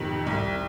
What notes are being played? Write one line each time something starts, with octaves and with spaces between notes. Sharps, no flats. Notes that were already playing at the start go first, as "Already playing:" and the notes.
Already playing: F2 C3 D#3
C2